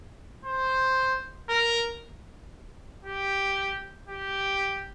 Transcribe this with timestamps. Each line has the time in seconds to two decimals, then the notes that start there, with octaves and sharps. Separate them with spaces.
0.45 C5
1.49 A#4
3.05 G4
4.08 G4